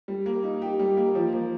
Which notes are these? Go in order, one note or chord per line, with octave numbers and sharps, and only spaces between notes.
G3
A#3
D#4
G4
G3
A#3
F3
A#3